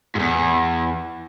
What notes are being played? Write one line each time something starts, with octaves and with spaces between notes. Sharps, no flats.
E2 G#2